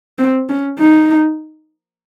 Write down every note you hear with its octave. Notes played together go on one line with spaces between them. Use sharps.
C4
C#4
D#4